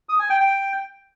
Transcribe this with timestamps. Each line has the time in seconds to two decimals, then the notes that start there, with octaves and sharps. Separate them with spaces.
0.09 D#6
0.19 G#5
0.30 G5
0.40 G5